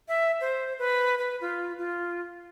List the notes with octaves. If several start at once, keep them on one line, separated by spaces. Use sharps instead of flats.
E5
C5
B4
B4
F4
F4